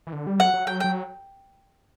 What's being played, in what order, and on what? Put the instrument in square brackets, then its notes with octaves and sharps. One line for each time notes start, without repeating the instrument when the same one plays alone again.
[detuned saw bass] E3
D3
G3
[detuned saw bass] F#3 [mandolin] F#5
[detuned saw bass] F#3
[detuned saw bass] F#3 [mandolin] G5
[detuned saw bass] F#3 [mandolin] G5